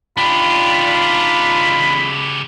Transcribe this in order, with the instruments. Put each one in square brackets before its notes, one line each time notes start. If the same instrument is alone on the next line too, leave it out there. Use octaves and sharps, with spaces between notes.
[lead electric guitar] C#3 G4 [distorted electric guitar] D4 D#4 [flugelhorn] F4 [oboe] B5